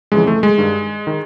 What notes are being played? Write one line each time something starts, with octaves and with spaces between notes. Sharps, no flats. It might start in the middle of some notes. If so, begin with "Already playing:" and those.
F2 C#3 E3 G#3
A3
G#3
G2 D#3
D#3